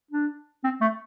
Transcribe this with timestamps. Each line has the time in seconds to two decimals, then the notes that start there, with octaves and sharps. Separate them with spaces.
0.11 D4
0.64 C4
0.81 A3